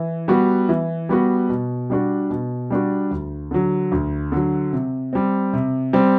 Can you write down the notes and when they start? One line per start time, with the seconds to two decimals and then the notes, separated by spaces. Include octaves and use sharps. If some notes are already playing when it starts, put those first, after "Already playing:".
Already playing: E3
0.28 G3 B3 F#4
0.69 E3
1.09 G3 B3 F#4
1.49 B2
1.90 G3 D4 F#4
2.30 B2
2.70 G3 D4 F#4
3.11 D2
3.51 D3 F#3
3.92 D2
4.32 D3 F#3
4.73 C3
5.13 G3 C4
5.53 C3
5.93 G3 C4